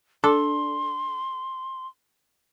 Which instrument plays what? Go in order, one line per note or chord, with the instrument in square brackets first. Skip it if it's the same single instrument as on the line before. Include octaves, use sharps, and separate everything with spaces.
[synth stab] D4 [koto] A4 [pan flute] C6